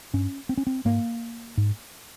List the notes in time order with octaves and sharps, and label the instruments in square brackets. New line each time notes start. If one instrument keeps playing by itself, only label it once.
[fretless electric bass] G2 C#4
C4
C#4
C4
G#2 A#3
G#2